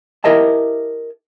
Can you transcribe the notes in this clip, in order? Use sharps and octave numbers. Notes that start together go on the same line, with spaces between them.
E4 G4 A#4 D#5 E5 A5